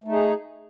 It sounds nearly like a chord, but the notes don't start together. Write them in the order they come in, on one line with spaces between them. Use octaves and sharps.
A3 D#4 G#4